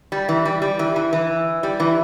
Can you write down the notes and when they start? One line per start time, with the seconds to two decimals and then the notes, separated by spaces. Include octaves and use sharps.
0.12 G3
0.29 E3
0.45 G3
0.62 G3
0.79 E3
0.96 E3
1.13 E3
1.63 G3
1.80 E3